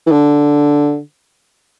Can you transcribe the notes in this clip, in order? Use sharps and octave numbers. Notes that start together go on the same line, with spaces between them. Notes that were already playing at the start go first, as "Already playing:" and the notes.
E3
D3